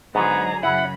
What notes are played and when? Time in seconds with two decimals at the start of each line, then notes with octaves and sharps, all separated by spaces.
0.15 G#2 D3 F#3 B3 G#4 A#5
0.63 F#2 C#3 E4 F#5 B5